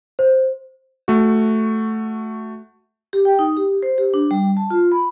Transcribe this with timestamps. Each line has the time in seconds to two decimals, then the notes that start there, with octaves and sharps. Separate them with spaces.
0.19 C5
1.08 A3 F#4
3.13 G4
3.25 G5
3.39 D#4
3.57 G4
3.83 C5
3.98 G4
4.14 D4
4.31 G3
4.57 A5
4.70 F4
4.92 B5